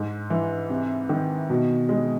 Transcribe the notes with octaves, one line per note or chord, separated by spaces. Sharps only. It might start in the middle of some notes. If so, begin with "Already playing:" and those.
Already playing: G#2
E3
C3
D#3
B2
G#3